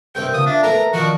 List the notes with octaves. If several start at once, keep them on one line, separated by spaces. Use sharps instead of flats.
G2 C3 C4 A#4 G5
C#3 F3 B3 D#6
D4 E5
A3 B3 A#4 A#5
D#3 F3 D4 F#4 A#4